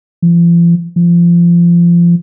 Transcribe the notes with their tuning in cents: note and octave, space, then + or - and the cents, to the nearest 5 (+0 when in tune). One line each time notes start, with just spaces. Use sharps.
F3 -45
F3 -25